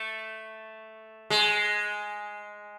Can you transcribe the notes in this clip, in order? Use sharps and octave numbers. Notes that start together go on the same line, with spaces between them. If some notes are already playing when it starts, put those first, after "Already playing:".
Already playing: A3
G#3